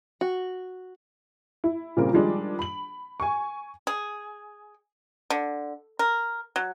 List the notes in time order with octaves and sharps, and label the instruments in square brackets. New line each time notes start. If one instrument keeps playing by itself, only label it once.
[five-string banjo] F#4
[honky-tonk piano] E4
A#2 C#3 G3 C4 F4 A#4
D#3 F3 G3 G#3 D4
B5 F#7
G#5 C#6
[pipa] G#4
D3
A#4
F#3